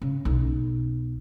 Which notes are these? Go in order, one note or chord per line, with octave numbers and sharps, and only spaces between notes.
C#3
B1